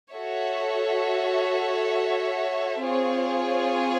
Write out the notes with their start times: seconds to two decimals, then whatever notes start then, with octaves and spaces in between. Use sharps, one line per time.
0.12 F#4 A4 C#5 E5
2.82 C4 F4 G#4 C#5